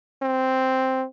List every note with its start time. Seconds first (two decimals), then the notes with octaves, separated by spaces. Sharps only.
0.22 C4